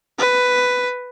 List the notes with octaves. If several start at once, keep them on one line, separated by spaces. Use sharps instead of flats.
B4